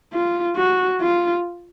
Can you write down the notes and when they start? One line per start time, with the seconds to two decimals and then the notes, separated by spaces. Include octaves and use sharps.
0.13 F4
0.56 F#4
1.00 F4